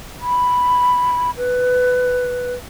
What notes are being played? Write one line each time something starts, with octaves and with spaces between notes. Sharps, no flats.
B5
B4